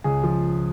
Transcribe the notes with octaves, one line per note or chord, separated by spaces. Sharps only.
C#2 G#4
F3